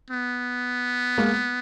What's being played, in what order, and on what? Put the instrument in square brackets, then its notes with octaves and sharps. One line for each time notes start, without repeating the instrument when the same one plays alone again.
[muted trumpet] B3
[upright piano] G#3 A#3